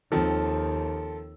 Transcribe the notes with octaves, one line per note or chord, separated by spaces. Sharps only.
D#2 D#3 F3 C4 A4